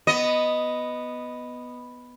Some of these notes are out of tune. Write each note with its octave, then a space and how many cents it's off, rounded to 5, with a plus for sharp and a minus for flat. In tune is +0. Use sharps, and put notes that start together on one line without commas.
B3 +0 D#5 +0